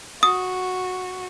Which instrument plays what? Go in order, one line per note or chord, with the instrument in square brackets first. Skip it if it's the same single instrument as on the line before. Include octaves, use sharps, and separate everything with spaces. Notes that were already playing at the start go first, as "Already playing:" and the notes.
[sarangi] F#4 [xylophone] D#6